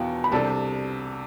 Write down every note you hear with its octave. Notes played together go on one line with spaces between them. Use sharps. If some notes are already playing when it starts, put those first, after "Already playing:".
Already playing: E2 B2 B3 E4 F5 G5
B5
C2 C3 G3 D4 A4 A5